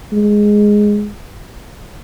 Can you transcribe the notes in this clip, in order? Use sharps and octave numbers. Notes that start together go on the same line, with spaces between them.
G#3